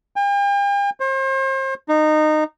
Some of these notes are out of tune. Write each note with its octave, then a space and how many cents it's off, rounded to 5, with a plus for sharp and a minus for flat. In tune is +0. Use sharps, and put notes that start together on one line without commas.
G5 +45
C5 +35
D#4 -20